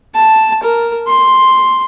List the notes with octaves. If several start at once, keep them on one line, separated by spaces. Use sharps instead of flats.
A5
A#4
C6